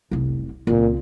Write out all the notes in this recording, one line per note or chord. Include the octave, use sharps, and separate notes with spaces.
F1 C2
C#2 A#2 C4